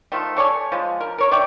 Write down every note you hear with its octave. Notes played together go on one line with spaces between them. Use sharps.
D#3 F3 A3
A4 C#5 D5 G#5
F3 G#3
A#4
A#4 C#5
C#5 D5 E5 G5